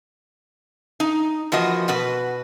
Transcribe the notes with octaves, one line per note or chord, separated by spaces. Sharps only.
D#4
E3 F3 A#3 F#4 D#5
B2 F#4 B4